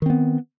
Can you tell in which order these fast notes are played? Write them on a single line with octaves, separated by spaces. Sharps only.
D#3 C4 B3